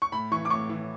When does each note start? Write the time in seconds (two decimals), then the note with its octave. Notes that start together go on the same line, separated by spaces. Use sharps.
0.02 C#6
0.12 A2 B5
0.31 E3 C#6
0.45 D6
0.50 A2 C#6
0.69 E3